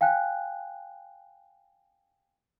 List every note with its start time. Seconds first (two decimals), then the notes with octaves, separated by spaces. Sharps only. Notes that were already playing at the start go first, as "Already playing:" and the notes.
0.01 F5 G5 G#5 F#6